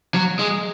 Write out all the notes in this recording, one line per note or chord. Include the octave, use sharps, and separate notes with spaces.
F#3
G#3